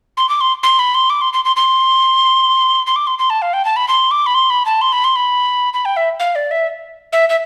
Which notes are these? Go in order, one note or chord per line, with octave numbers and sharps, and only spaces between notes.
C6
D6
C6
C6
B5
C6
D6
C6
C6
C6
C6
C6
D6
C6
C6
A5
F5
G5
A5
B5
C6
D6
B5
C6
B5
A5
C6
B5
C6
B5
B5
G5
E5
F5
D5
E5
E5
E5